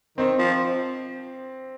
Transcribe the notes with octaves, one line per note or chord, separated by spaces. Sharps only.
D#3 C4
F3